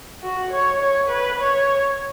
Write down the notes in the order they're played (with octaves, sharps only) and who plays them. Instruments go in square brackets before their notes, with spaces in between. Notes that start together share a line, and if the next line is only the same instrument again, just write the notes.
[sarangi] F#4
C#5
C#5
B4
C#5